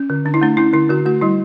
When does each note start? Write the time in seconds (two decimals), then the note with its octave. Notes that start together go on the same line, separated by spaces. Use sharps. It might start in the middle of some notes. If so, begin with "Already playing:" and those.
Already playing: C#4
0.10 D3
0.25 D3 D4
0.34 E4
0.41 A3 D4
0.57 C#4 E4
0.73 D3 E4
0.89 D3 F#4
1.05 A3 F#4
1.21 G3 E4